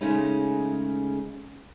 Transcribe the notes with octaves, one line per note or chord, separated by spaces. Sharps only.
C#3 G#3 A3 C#4 D#4